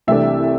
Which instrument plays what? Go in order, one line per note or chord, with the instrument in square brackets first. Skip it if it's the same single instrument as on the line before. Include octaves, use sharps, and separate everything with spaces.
[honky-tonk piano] C2 C3 E3 A3 D4 E5